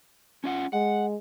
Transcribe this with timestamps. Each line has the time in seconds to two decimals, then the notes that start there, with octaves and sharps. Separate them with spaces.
0.44 C#4 F4 F#5
0.73 G#3 F#5